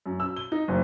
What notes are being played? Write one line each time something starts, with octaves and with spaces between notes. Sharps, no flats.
F#2
E6
G7
D#4
F#1